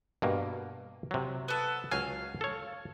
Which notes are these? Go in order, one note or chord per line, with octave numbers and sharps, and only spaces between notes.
G2 B2 A#3
C3 F#3
B3 A4
C#2 F#3 F5 G#5
A4 C#5